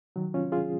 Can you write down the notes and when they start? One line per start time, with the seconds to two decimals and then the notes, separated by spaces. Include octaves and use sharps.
0.16 D#3 F#3
0.34 C#4 F4
0.52 F4 G#4